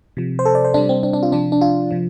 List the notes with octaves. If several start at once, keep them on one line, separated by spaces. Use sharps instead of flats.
C3 F3
C5
A4
D5
C5
C3 G3 D4
C4
D4
D4
F4
C3 F3 D4
D4
F4
C3 F3